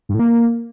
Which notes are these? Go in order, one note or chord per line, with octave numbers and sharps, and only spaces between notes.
G2
A2
A#3